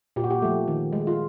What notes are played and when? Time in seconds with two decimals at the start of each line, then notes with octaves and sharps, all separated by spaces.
0.16 A#2 G4
0.24 F#4
0.30 G4
0.42 F3 A3
0.68 D#3
0.93 G#3
1.07 F4